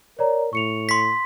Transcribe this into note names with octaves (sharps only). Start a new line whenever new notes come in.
A#4 C#5 D5 A#5
A2 C#6 C#7 F7
C6 B6